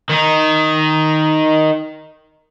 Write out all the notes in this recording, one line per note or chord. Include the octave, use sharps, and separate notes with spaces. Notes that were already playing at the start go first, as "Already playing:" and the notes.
D#3 D#4